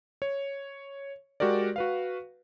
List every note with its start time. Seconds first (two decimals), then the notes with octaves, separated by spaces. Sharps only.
0.22 C#5
1.40 G#3 F#4 G4 A#4 D5
1.76 F#4 B4 F5